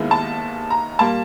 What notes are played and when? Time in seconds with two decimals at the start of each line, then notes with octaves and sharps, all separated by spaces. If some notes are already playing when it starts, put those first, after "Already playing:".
Already playing: D#2 D#3 G#3 B3 E4
0.11 A5
0.70 A#5
0.99 A#2 G3 A#3 A5